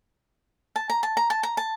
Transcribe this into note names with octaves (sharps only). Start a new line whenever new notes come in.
A5
A#5
A5
A#5
A5
A#5
A5